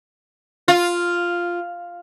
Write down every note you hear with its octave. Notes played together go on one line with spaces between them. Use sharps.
F4